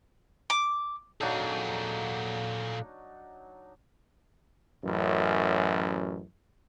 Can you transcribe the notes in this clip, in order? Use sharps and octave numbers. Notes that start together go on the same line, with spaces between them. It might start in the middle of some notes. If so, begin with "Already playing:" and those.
D6
A#2 F#3 D4 D#4 G#4 A4 F5
A1 F#2